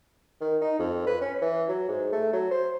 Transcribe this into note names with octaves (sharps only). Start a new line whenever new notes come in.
D#3
D#4
F2
B4
C#4
E3
F#3
G#2
A3
F#3
C5